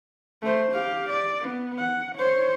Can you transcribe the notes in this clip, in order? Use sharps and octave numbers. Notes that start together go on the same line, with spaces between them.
A3 C5
G4 F5
D5
B3
F#5
C5 C#5